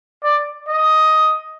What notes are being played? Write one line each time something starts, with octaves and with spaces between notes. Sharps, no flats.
D5
D#5